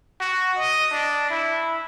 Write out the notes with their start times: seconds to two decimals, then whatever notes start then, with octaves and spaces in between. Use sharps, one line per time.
0.20 F#4
0.59 D#5
0.92 D4
1.30 E4